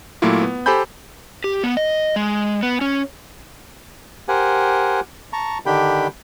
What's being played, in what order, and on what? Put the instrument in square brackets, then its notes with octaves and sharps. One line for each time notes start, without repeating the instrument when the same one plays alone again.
[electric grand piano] A#2 F#3 A3 A#3 E4 F4
B3
G4 A4 C5 G#5 B5 G6
[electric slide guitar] G4
B3
D#5
G#3
B3
C#4
[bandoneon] G4 A#4 C5 F#5 G#5
A5 A#5 C#6
D3 D#3 D4 G4 G5 B5